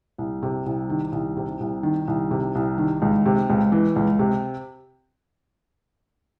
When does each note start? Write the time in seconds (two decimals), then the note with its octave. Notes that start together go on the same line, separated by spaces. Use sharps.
0.18 C2
0.43 C3
0.66 C2
0.90 D#3
1.12 C2
1.37 C3
1.60 C2
1.83 D#3
2.08 C2
2.31 C3
2.55 C2
2.78 D#3
3.02 C#2
3.26 C3
3.50 C#2
3.72 E3
3.96 C#2
4.19 C3